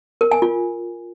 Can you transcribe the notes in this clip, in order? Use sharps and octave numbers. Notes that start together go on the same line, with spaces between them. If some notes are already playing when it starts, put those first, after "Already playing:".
A#4
G#5
F4